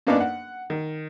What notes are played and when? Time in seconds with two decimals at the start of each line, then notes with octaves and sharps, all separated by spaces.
0.07 F#2 A#3 B3 D4 D#4 D5
0.20 F#5
0.70 D#3